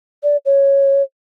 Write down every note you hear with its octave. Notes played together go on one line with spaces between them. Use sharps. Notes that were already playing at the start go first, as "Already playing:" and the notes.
D5
C#5